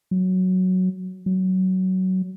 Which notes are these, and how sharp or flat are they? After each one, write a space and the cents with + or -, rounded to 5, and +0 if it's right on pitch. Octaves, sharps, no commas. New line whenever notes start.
F#3 +0
F#3 +15